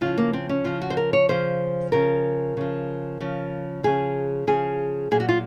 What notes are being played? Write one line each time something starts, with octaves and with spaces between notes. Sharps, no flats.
C#3 F3 F4
A#3
C4
C#4
C#3 F3 F4
F#4
C5
A#4
C#5
C#3 F3 C5
C#3 F3 A#4
C#3 F3
C#3 F3
C#3 F3 G#4
C#3 F3 G#4
A#2 F#3 G#4
F#4
F4